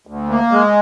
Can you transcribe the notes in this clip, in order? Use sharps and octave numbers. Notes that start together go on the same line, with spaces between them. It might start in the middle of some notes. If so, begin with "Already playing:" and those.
D2
A#3
G#3